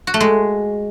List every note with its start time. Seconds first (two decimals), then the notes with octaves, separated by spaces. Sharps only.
0.07 F#4
0.14 A3
0.20 G#3